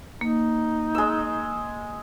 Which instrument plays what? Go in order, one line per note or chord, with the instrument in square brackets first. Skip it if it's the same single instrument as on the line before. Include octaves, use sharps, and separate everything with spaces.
[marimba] A#3 [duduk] D#4
[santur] G#3 E6